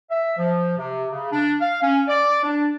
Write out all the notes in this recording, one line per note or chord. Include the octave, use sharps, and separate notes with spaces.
E5
F3
C3
C#3
D4
F5
C#4
D5
D4